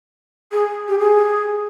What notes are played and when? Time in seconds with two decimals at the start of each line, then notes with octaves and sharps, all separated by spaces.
0.52 G#4
0.88 G4
0.99 G#4